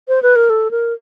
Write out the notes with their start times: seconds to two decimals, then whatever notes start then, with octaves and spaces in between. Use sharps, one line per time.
0.08 C5
0.23 B4
0.36 A#4
0.50 A4
0.71 A#4